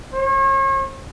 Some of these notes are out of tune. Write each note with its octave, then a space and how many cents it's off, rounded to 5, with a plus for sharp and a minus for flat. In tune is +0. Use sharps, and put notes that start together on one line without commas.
C#5 -40